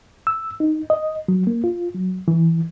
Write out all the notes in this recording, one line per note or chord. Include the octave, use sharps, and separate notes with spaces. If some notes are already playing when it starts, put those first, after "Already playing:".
E6
D#4
D#5
F#3
A#3
F4
F#3
E3